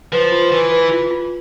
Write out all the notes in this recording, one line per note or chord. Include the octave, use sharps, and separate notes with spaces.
F3 B4
F4
E3 B4
B4
F4
F4